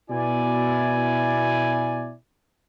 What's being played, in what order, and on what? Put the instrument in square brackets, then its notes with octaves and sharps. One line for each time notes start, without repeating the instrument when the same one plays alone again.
[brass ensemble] B2 E4 D5 G#5